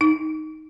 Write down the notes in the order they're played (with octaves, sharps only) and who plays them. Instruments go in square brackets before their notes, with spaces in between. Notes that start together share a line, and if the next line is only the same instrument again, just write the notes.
[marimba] D#4